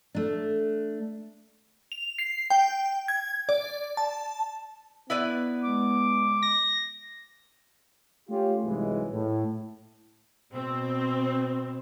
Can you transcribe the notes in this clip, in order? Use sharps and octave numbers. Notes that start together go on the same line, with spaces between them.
A3 D4
F7
C7
G5
G#6
D5
A5
B3 E4 B4 D5
G#3 D6
A#6
A3 C#4 F4 G4
C2 G#2 E3 F#3 G#3
A2
B2 C4